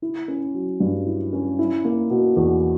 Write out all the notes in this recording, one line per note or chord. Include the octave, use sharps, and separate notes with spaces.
E4
C#4
F#3
G2
E4
C#4
E4
A#3
B2
E2